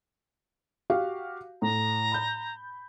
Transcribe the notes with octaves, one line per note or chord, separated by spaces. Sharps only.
F#4 G4 F5
A2 A#5
B5 G6